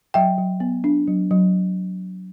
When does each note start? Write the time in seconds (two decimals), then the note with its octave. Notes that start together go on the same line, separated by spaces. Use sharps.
0.14 F#3 E5 G5
0.38 F#3
0.60 B3
0.84 D4
1.07 F#3
1.31 F#3